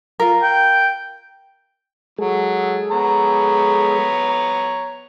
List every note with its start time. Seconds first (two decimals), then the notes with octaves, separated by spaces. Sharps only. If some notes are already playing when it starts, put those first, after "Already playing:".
0.20 F4 A#4
0.42 G5
2.18 F#3 G#3 G#4 A4
2.91 B3 C#5 A#5